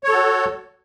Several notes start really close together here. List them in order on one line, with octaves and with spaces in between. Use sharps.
C#5 A4 F#4